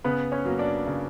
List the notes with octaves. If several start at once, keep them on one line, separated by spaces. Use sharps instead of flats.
C#3 B3 B4
C#4 C#5
F#3 A#3
D4 D5
C#3